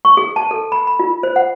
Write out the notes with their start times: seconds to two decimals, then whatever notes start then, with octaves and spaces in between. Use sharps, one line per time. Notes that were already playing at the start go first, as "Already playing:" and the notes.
0.05 C#6
0.17 G#4
0.36 A5
0.51 A4
0.72 B5
0.87 B5
1.00 F4
1.23 C5
1.36 F#5